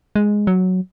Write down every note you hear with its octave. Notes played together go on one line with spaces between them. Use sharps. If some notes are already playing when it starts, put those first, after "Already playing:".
G#3
F#3